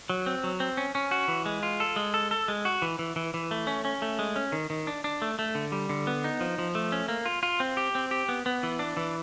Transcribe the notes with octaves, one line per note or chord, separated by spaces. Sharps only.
F#3
C4
F#3
C4
C#4
C#4
F#4
E3
G#3
F4
A4
G#3
A4
A4
G#3
F#4
E3
E3
E3
E3
A3
C#4
C#4
A3
G#3
C#4
D#3
D#3
D4
D4
A3
A3
D3
G3
D3
B3
D#4
F3
F3
A3
C#4
A#3
F4
F4
C4
G4
C4
G4
B3
B3
E3
D4
E3